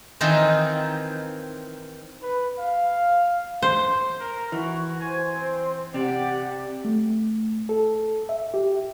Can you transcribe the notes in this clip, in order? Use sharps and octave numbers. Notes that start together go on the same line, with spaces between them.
D#3 E3 C4 D#4 F4
B4
F5
C5
A#4
E3 F#4 C#6
C5 G#5
C4
C3 G4 D5 F#5
A3
A4
E5
G4